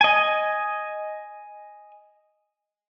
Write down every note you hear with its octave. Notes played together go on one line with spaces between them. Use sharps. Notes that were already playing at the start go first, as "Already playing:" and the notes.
D#5 G#5